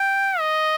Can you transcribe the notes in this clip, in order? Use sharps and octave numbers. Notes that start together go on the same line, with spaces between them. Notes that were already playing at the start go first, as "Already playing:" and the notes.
Already playing: G5
D#5